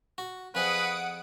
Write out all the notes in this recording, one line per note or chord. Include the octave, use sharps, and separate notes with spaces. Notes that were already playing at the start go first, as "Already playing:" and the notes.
F#4
F2 G#4 B4 F#5 D#6 D7